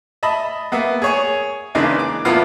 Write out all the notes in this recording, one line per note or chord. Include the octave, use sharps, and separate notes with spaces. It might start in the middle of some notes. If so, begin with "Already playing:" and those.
D#5 E5 A5 B5
A#3 B3 E5
G#4 C#5 G#5
C#3 E3 G#3 A#3 D4 D#4
D6
E2 A2 A#3 B3 E4 F4